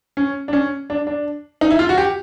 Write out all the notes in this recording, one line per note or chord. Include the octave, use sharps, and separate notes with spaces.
C#4
D4
C#4
D4
D4
D#4
E4
F4
F#4
G4